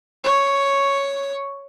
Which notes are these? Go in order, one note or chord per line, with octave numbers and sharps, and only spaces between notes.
C#5 C#6